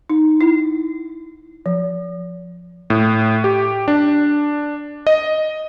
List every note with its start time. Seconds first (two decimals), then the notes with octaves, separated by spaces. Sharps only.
0.10 D#4
0.41 E4
1.66 F3
2.90 A2
3.44 G4
3.88 D4
5.07 D#5